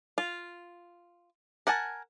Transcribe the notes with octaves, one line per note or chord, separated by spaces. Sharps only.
F4
A#4 F#5 G#5 A5